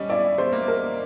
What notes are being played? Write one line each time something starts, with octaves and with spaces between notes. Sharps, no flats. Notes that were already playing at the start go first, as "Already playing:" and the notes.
Already playing: G3 C#4 D#5
E4 D5
C5
A#3
A#4